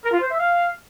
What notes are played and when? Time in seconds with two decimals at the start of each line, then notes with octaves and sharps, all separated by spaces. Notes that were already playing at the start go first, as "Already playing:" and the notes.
0.04 A#4
0.13 F4
0.21 C5
0.30 E5
0.39 F5